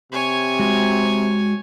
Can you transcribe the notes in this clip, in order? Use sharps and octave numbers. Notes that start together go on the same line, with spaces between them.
C3 C#5 G#5
G#3 F#4